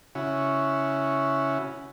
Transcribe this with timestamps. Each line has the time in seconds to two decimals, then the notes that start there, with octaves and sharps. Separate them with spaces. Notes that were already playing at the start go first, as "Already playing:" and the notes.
0.15 C#3 C#4 E4 F#4